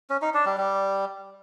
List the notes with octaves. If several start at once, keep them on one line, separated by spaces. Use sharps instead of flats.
C#4
D#4
D4
G3
G3